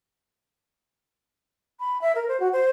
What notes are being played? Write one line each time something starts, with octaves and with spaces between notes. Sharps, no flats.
B5
E5
A#4
C5
F#4
C5